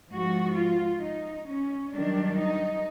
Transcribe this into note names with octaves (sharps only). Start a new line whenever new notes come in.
G#2 F3 F#4
F4
D#4
C#4
G2 D#3 F#3 D4
D#4